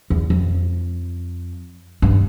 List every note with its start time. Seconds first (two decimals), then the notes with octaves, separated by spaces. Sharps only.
0.10 E2
0.30 F2
2.02 G2